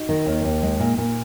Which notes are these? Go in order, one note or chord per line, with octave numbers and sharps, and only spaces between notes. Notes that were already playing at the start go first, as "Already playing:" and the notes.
Already playing: D#4 F#4
D#3
D#2
D#2
G#3
A#2
A#2